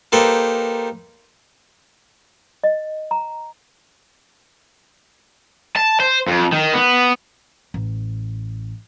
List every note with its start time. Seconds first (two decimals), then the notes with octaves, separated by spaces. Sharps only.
0.12 A#3 D#4 G4 A4 B4 C5
2.64 D#5
3.11 A#5
5.77 A5
6.00 C5
6.27 F2
6.52 D#3
6.74 B3
7.74 A1